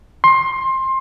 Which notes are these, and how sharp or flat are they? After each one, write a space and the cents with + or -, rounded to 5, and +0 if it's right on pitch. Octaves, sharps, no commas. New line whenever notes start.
C6 +20